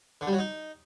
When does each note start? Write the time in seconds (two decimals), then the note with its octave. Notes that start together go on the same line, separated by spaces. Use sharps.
0.21 D3
0.27 G3
0.33 F#3
0.39 D#4